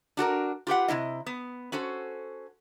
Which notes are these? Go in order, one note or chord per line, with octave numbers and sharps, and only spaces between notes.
D4 F#4 A4 A#4
F4 G4 B4 F#5
C3 G#3 E4 D#5
B3
C#4 F#4 A4 C5